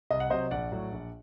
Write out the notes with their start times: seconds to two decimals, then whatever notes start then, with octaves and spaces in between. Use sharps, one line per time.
0.11 C2 D#5
0.20 F#5
0.30 C3 F#3 C5 D#5
0.51 A#1 D5 F#5
0.72 A2 F#3
0.92 A#1